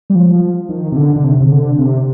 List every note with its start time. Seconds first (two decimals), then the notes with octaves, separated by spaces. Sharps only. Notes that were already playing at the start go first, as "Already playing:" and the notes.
0.10 G3
0.15 F3
0.69 D#3
0.92 C3
0.96 D3
1.16 D3
1.24 C3
1.40 C3
1.52 D3
1.79 C3